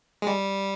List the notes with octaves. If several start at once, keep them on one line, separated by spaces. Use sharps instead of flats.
G#3
G3